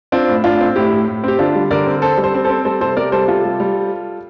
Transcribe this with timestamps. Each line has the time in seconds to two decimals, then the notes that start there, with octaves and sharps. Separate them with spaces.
0.12 C4 D4 F4
0.28 A2
0.44 A2 D4 F4
0.60 C4
0.76 A2 E4 G4
0.92 A2
1.08 A2
1.24 C4 G4
1.39 D3 D4 F4
1.55 G3
1.71 D3 A#4 D5
1.86 C4
2.02 C4 A4 C5
2.18 G3
2.24 A4 C5
2.34 C4
2.45 C4 A4 C5
2.65 G3 A4 C5
2.81 C3 A4 C5
2.97 C3 A#4 D5
3.12 G3 A4 C5
3.28 C3 F4 A4
3.44 G3
3.60 G3